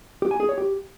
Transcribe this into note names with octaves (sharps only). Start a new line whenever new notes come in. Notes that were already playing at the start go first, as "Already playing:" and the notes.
G4
G#5
G#4
C#5
G4